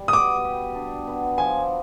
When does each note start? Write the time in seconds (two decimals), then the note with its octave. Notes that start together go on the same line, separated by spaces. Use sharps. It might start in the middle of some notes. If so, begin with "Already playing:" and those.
Already playing: G3
0.08 D#6
0.13 B2 D6
0.44 G4
0.75 D4
1.07 B3
1.38 F3 G#5